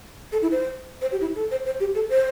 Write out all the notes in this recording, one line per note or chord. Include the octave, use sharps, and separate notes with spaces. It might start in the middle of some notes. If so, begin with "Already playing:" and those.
A4
E4
C5
C5
G4
E4
A4
C5
C5
G4
A4
C5